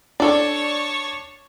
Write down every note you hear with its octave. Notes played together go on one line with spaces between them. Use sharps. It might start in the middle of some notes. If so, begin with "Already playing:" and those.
D4 A4 C#5 D5 A5